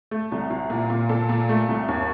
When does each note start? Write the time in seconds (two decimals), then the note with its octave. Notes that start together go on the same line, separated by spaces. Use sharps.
0.11 A3
0.32 C2
0.50 C2
0.70 A#2
0.90 A#2
1.09 A#2 A4
1.29 A#2
1.49 A3
1.69 C2
1.88 D#2